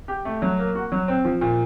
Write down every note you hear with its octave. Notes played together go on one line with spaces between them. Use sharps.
G4
A3
F#3
A#3
F#4
F#3
C4
F3
A#2